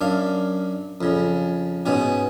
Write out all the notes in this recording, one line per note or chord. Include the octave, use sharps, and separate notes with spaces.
F#2 D4 F5
F2 C#3
G#2 B2 C#4 F#4